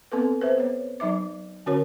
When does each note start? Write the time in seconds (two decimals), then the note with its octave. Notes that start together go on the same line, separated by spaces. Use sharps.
0.12 B3 C4 A4 B4
0.41 B4 C5 E5
0.58 B3 C#5
1.00 F#3 D#4 E5 D6
1.66 D3 C#4 F#4 A#4 C#5